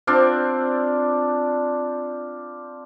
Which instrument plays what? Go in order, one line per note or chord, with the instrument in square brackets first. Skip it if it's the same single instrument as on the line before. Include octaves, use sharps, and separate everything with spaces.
[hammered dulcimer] C4 D4 F4 D5